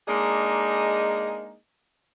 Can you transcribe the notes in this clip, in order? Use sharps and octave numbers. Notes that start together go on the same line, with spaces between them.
G#3 A#3 D4 D#4 G#4 D#5